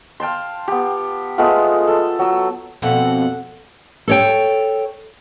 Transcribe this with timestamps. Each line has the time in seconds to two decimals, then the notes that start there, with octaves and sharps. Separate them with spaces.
0.20 F5 G5 A5 C6
0.68 B3 G4
1.38 G#3 A3 B3 F4
1.87 A4
2.19 F#3 E6
2.82 F2 B2 A4 F#5
4.08 A4 C#5 G5